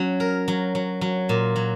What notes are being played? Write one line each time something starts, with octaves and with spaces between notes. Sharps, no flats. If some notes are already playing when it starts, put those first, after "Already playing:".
Already playing: F#3 C#4
A#4
F#3
F#3
F#3
A#2
F#3